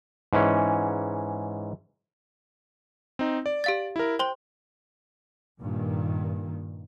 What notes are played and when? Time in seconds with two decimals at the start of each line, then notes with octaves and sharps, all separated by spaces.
0.33 G#2 E3 C#4
3.19 C4 D#4
3.46 D5
3.64 G4 F5 A6
3.96 E4 A#4
4.19 C5 G5 C6 G7
5.60 G2 A#2 D#3